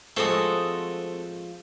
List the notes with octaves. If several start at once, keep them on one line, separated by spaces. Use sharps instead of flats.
F3 G#3 A3 C4 F#4 D#6